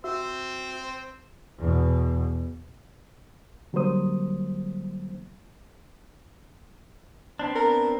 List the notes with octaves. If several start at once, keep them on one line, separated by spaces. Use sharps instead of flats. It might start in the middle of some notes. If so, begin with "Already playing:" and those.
C4 F#4 C5 E5 E6
E2 B2
D3 F#3 G3 A#3 C5 D#6
B3 C4 D4
A#4